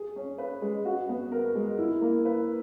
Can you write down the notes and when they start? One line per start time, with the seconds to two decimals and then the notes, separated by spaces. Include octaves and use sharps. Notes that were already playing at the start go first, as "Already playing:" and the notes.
Already playing: G#4
0.16 C#4
0.38 B4
0.62 G#3
0.85 F#4
1.09 B3
1.32 A#4
1.55 G#3
1.78 E4
2.01 A#3
2.25 B4